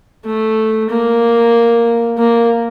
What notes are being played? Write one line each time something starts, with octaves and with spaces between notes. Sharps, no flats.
A3
A#3
A#3